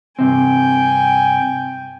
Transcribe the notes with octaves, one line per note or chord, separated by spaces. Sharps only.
G2 C3 C4 G5 G#5